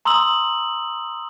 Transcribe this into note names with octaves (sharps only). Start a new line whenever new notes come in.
A#5 C6 D#6 E6 F#7